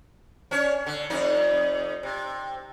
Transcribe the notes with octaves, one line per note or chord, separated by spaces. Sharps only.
C#4 D4 C#5
D3
F2 D#4 D5
C3